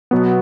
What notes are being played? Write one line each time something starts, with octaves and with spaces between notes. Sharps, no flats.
B2 F#3 B3